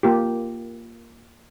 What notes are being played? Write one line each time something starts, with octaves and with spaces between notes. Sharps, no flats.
A#3 F4 G4